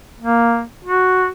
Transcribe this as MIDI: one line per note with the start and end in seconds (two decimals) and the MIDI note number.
0.20 0.63 58
0.84 1.28 66